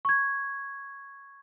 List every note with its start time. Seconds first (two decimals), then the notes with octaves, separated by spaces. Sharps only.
0.05 C#6 G#6